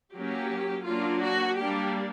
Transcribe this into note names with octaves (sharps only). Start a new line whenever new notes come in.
F#3 A#3 C#4 G4
F#3 A#3 D4 F4
F#4
G3 A#3 D4 G4